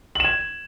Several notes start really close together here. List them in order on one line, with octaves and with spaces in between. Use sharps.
F#7 E7 G#6